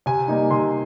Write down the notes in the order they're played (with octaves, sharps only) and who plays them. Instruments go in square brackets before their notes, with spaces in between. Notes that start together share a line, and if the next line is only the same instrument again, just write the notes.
[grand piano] C3 G#5
G3 A#3 D#4
C3 C6